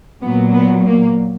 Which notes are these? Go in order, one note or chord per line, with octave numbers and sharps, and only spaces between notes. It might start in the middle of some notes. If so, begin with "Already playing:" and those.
A#2 F#3 B3
B3
A#3